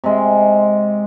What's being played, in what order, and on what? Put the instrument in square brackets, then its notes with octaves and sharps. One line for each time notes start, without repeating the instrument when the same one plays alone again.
[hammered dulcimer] C3 G#3